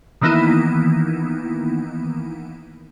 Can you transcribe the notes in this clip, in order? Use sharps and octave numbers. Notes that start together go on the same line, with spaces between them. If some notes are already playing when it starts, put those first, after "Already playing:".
D#3 E3 A#3 B3 D#4 E4